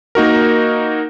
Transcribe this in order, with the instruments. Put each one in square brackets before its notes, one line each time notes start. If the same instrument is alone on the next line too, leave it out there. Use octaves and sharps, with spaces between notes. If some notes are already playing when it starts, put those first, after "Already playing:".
[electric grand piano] A#3 D#4 F#4 A#4